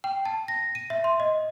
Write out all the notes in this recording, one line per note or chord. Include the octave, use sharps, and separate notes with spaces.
G5
A5
A#6
D#7
E5
C6
D#5